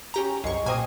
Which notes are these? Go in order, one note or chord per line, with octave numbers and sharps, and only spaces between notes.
C#4 G4 A#5
C2 F#2 G#3 C#6
A#2 A#3 C4 D#5 G#5